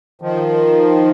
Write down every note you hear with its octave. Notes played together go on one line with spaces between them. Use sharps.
D#3 F3